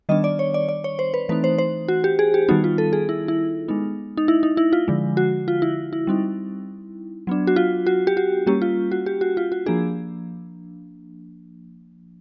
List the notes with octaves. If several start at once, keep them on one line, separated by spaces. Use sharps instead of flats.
D#3 G3 B3 D4 D#5
D5
C#5
D5
D5
C#5
C5
B4
E3 A3 C4 D#4 B4
C5
C5
F#4
G4
G#4
G4
D#3 G3 B3 D#4 F#4
F4
A4
G#4
E4
E4
G#3 B3 D#4
D#4
E4
D#4
E4
F4
D3 F3 G#3
F#4
F4
E4
E4
G3 C4 D#4
F#3 B3 D4
F#4
F4
F#4
G4
F#4
G3 A#3 C#4 G4
F4
F#4
G4
F#4
F4
F#4
F3 A#3 D4 G#4